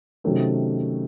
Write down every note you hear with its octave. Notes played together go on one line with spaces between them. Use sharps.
C3 D#3 F#3 A3 C#4